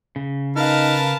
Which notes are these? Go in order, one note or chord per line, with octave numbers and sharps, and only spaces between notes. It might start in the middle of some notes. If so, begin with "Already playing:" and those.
C#3
D#4 A#4 B4 F5 A5 F6